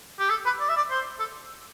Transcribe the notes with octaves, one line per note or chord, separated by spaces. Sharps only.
G4
A4
B4
D5
E5
D5
C5
A4